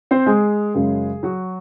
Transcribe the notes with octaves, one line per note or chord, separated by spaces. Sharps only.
C4 C5
G#3 G#4
F#2 C#3 G#3
F#3 F#4